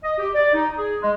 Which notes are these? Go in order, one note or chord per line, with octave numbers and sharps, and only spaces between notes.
D#5
G4
D5
D#4
G#4
G#3